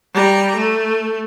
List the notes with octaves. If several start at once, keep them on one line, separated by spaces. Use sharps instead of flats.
G3 A#5
A3